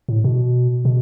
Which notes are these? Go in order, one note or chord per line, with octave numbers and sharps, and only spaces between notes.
A2
B2
B2